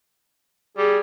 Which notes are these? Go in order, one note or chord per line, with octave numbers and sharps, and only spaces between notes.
G3 G#4